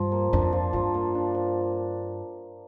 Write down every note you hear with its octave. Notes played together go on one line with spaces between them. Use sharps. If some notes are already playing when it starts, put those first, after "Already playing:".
Already playing: G2 F3
A#3
F2 D4
F3
G2 F3
A#3
D4
F3